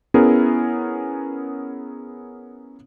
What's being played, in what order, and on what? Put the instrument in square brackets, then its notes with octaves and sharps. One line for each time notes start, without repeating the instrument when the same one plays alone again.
[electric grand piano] B3 C#4 E4 G#4 A#4